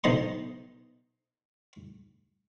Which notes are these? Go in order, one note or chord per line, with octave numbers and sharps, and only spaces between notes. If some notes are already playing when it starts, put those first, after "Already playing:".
B1 D#4 C5 D#5 C6